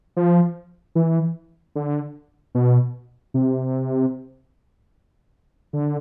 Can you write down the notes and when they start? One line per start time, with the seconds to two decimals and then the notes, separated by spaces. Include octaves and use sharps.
0.17 F3
0.95 E3
1.75 D3
2.55 B2
3.34 C3
5.73 D3